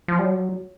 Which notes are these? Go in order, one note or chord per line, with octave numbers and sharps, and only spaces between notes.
F3
G3
F#3